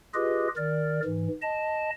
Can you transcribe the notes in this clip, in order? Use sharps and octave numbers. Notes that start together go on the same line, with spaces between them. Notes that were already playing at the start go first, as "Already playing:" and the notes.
F4 G4 G#4 B4 D#5
D#3 A#4 D5
G#2 E3
D#5 A5